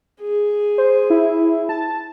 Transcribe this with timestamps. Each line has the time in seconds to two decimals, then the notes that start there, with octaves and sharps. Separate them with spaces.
0.21 G#4
0.78 C5
1.10 E4
1.69 A5